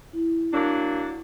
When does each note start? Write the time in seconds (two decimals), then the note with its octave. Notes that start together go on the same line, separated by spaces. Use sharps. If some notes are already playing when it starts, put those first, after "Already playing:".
0.13 E4
0.53 F#3 A#3 D4